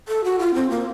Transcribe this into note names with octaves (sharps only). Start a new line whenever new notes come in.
A4
F#4
F4
C4
A#3